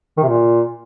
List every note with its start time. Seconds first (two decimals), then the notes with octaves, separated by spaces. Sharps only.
0.17 D#3
0.23 C3
0.28 A#2